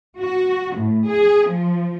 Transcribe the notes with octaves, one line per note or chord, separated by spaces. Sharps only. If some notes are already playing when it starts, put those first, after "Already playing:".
F#4
A2
G#4
F3